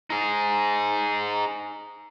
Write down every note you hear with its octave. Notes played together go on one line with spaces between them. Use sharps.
D#4 G#4